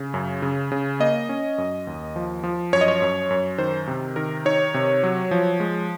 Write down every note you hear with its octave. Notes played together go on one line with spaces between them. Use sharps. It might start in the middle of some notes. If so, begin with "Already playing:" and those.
Already playing: C#3
F#2
C#3
C#3
A#3 D#5
C#4
F#2
D#2
F3
F3
F#2 C#5
D#5
C#5
F#2
F#2
D#3 C5
C3
D#3 A#4
D#4 C#5
C3
F#3
F3
G#3